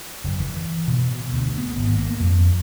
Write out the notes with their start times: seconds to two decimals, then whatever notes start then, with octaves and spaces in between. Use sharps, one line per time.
0.24 F#1
0.40 E3
0.87 B2
1.33 D2
1.58 B3
1.75 G#1
1.96 A#3
2.20 F2